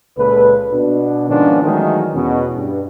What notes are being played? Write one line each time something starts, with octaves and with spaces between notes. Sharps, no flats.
C#2 A#2 A4 B4
B2 D4
G#2 D#3 F3 B3 C#4 D4
D#3 E3 F#3 G#3 A3
E2 B2 C#4
G2